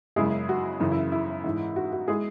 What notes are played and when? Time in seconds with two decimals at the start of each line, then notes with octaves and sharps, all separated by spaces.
0.16 F#2 C#3 G#3 E4 G#4
0.49 F#4
0.80 F#2 C#3 E3
0.92 E4
1.12 E4
1.44 G#2 E3 G#3
1.76 F#4
1.92 F#4
2.08 G#3 E4 G#4